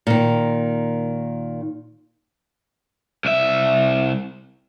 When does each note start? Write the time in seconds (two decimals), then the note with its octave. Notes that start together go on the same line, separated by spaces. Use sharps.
0.07 A#2 D#3
3.25 C2 E5